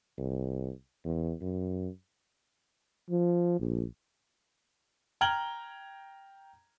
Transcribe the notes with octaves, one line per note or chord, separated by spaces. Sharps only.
C2
E2
F#2
F3
A#1
G5 A#5 F6 G#6 F#7 G7